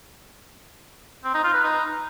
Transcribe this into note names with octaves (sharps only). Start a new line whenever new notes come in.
C4
D#4
F4
B4
D#4